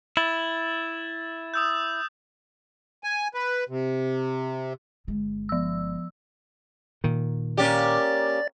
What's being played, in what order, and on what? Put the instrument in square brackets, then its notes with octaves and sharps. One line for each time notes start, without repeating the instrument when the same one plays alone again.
[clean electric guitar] E4 [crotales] A6
[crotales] D#6 E6 G6
[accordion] G#5
B4
C3
[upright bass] G1 G#3
[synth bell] F3 E6
[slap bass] A#2 D#3
[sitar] A#3 C#4 G4 [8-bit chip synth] D5 A6